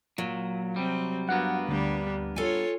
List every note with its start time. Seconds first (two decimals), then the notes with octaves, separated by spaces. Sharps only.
0.18 A#2 F#3
0.76 C3 G3 C4
1.29 G2 A#3 B3 F#4 F#5
1.68 D2 G3 D4
2.36 F4 A4 C#5 G#5